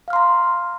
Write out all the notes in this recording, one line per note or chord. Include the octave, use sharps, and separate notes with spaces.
F5 A#5 C6 F6